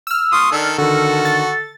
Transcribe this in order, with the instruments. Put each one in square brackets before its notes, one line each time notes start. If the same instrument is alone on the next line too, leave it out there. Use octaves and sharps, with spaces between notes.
[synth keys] E6 F6
[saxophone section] A#3 F4 [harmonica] C6 C#6 D#6
[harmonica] D#3 A4 [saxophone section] D4
[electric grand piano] D3 D#3 [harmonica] F#4 [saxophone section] A4
[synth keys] A6